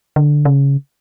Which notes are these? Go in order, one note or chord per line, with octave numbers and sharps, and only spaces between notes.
D3
C#3